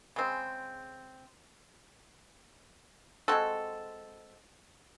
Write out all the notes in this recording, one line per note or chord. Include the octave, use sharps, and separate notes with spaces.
C#3 G#3 C4
G#3 C4 F#4 A4